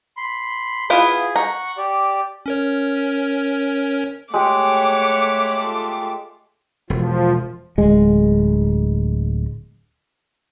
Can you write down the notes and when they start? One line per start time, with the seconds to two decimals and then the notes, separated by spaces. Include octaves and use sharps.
0.17 B5 C6
0.90 B3 E4 F4 G#4
1.36 F#5 A#5 C#6
1.78 G4 D5
2.46 C#4 A#4 C#5
4.34 G#3 A3 G4 C#5 F#5 D6
5.61 F4 A4
6.90 E1 F3
7.78 D1 G#3